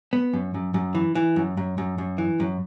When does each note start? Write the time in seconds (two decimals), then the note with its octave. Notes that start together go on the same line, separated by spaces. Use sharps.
0.13 B3
0.33 F#2
0.54 F#2
0.74 F#2
0.95 E3
1.15 E3
1.36 F#2
1.57 F#2
1.78 F#2
1.98 F#2
2.18 E3
2.40 F#2